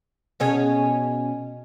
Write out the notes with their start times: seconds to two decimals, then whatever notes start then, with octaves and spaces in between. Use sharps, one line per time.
0.40 B2 C#4 G#4